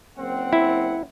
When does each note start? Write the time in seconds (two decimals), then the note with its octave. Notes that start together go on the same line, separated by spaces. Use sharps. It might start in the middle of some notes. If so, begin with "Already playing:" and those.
0.17 F#1 C4 F#5
0.53 E4